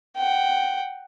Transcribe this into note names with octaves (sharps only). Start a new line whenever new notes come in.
F#5 G5